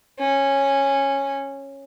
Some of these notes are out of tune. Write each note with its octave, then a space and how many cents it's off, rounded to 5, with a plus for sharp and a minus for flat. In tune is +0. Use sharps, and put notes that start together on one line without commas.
C#4 -10